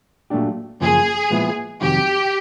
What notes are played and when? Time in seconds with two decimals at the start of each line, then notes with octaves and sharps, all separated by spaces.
0.30 A#2 F#3 A3 D4 G4
0.81 F#2 C#3 F3 A#3 G#4
1.30 A#2 F3 G#3 B3 E4
1.81 F2 C3 D#3 F#3 G4